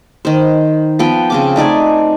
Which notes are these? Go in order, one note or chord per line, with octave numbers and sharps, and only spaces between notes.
D#3 C5
F3 B3 G5
C#3 C4 D6
A3 D#4 D5 G#5